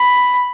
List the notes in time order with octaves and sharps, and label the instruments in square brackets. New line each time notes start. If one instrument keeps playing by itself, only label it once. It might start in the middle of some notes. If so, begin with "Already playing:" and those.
Already playing: [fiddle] B5